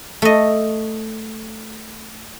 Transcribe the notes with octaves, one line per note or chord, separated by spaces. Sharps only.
A3 D#5